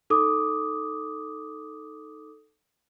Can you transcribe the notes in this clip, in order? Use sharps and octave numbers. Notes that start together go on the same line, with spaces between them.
D#4 A4 D6 D#6